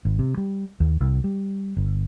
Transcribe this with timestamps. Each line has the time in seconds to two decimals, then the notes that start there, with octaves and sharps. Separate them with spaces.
0.05 G#1
0.19 C3
0.37 G3
0.80 D#2
1.01 C2
1.24 G3
1.77 G1